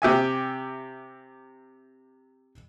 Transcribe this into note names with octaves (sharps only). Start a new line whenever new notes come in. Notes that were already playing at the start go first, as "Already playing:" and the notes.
C3 G4 E5 G#5